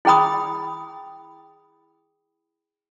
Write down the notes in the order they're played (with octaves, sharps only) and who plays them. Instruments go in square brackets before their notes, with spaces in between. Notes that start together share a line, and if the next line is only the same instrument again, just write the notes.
[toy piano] E4 G#4 G5 B5 D#6